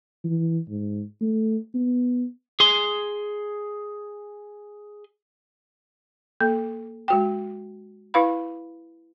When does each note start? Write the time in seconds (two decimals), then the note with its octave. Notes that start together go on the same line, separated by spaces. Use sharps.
0.24 E3
0.68 G#2
1.21 A3
1.75 B3
2.60 G#4 C6
6.40 A#3 A4
7.08 G#3 F#4 G5
8.14 E4 B4 F5 B5